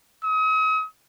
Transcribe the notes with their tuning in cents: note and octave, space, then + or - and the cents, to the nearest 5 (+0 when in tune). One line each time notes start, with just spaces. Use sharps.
D#6 +40